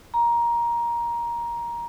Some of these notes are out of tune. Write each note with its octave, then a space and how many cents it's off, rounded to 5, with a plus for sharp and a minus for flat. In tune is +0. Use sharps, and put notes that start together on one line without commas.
A#5 +15